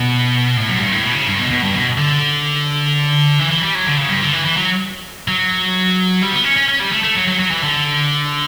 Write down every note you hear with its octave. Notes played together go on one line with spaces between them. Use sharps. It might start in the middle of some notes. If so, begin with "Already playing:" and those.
Already playing: B2
A2
F#2
G2
A2
B2
C#3
G2
B2
B2
G2
B2
D3
E3
E3
G3
F#3
D3
C#3
G2
D3
E3
E3
F#3
F#3
G3
B3
C#4
C#4
C#4
G3
A3
A3
F#3
F#3
F#3
E3
D3